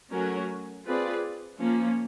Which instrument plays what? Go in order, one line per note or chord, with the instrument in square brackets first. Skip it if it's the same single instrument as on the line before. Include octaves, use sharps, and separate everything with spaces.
[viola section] F#3 A3 C#4 F#4 A#4
C4 F4 G#4 B4 D5
F3 A#3 C#4